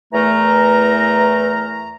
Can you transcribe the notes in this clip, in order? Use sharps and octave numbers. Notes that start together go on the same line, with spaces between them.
E2 E3 A3 A#4 A#5